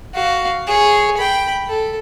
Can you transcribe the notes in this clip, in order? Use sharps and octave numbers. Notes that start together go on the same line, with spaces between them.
F#4 F5
G#4 C#5
G5 B5
A4